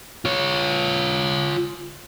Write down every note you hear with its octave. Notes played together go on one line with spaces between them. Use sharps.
F4 C#5